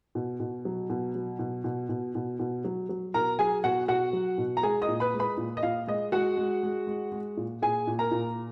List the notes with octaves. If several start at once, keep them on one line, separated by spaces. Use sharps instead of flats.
B2
B2
F#3
B2
F#3
B2
B2
B2
B2
B2
F#3
F#3
B2 A#4 A#5
F#3 G#4 G#5
B2 F#4 F#5
B2 F#4 F#5
F#3
B2
A#5
G#3 G#4 G#5
D#5 D#6
A#2
B4 B5
G#3
B4 B5
A#2
D#5
A#2 F5
G#3 D#5
G#3 F#4 F#5
G#3
G#3
G#3
G#3
A#2
A#2 G#4 G#5
A#2
A#4 A#5
A#2